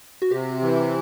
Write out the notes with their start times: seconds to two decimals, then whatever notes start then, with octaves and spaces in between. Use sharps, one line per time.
0.22 F#4
0.31 C3 G4
0.61 E3